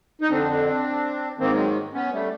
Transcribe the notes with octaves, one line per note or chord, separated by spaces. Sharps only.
D#4
F2 D3 C4 D4
G#2 D#3 A#3 C4
F#3 G#3
B3 C#4
G3 A3